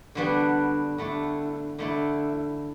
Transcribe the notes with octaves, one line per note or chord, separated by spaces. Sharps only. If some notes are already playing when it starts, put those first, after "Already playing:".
D3 G3 B3 D4 F#4
D3 A3 E4
D3 A3 E4